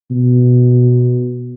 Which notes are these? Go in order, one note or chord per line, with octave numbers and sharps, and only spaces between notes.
B2